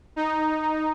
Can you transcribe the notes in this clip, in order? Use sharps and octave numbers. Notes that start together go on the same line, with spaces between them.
D#4